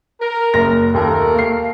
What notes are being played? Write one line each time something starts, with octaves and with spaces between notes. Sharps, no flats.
A#4
F#1 A#6
D#2 A3 A4 A#4
A#3 C7